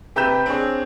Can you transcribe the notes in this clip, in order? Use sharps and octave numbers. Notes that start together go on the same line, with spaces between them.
C3 G4 B4 A#5 G6 E7
C4 D4 G#4 C#5